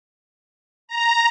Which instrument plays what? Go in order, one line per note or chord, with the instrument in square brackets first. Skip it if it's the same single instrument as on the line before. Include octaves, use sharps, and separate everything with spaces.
[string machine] A#5